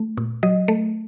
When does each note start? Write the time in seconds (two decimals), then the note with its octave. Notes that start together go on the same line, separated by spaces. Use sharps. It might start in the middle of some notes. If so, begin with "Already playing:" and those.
Already playing: A3
0.17 A#2
0.43 F#3 D#5
0.68 A3